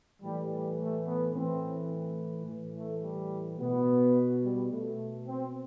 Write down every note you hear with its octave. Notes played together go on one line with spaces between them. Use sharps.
A2 E3 G3
G3
A3
B3
A2 E3 C4
A2 E3
A3
G3
B2 B3
G3
B2 A3
C4